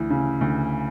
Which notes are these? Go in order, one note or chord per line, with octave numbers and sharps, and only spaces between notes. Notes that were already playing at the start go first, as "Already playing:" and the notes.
Already playing: D2 E3
C#3
D2